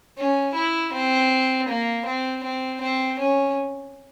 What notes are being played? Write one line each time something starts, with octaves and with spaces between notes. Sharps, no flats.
C#4
E4
C4
A#3
C4
C4
C4
C#4